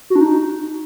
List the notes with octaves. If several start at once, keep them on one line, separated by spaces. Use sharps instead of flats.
F#4
D4
D#4